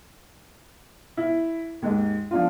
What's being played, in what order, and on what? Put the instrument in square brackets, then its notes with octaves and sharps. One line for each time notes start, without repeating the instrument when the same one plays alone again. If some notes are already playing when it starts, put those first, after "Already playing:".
[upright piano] E4
D#2 G#2
F3 D4 F4